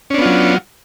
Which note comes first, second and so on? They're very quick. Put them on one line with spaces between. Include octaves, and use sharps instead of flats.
C#4 D4 B3 F4 F#3